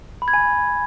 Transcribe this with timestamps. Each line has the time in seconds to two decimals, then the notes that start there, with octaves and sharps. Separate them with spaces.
0.22 B5
0.28 G#6
0.34 G#5